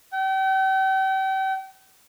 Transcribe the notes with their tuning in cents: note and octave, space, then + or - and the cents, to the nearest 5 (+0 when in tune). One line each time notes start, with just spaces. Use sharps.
G5 -40